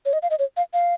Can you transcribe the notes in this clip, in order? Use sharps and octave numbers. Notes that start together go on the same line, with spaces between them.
C#5
D#5
F5
D#5
C#5
F5
F5